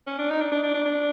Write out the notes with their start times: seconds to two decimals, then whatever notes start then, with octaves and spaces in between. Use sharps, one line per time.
0.07 C#4
0.19 D4
0.30 D#4
0.41 D4
0.52 D4
0.63 D4
0.74 D4
0.85 D4